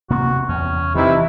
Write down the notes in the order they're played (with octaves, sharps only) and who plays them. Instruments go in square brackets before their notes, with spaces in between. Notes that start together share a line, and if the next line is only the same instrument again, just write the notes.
[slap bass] C3 A#3 B3 [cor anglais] F#4
[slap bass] E2 [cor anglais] C#4
[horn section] C3 D#4 E4 [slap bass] E3 [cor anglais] B4